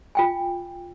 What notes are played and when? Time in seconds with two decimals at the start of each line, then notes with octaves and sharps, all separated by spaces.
0.15 F4 G5 G#5